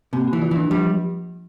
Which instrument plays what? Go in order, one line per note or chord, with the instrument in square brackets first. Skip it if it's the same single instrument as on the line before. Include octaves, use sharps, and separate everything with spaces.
[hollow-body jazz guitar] C3 [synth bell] A#3
[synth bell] A#3
[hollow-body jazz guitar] E3
[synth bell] F4
[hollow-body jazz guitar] E3 [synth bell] D4
[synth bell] F3 [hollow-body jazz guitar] G3